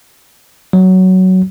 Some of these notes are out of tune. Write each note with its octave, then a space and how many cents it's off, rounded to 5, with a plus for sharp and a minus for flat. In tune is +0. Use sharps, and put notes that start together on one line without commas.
F#3 +10